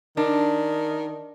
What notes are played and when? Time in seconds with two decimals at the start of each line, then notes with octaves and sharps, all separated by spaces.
0.17 D#3 D4